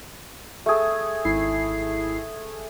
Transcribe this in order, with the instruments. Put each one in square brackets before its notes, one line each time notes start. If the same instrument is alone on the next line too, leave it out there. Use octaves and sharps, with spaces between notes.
[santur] A3 G#4
[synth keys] G#1 E4 C7